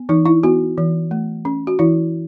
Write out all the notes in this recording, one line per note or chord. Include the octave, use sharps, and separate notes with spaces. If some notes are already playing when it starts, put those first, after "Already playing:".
Already playing: B3
E3 D#4
E4
B3 F#4
E3
A3
C#4
F#4
E3 E4